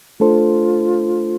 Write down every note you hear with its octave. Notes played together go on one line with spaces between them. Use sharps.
A3 D4 F4 A4 C5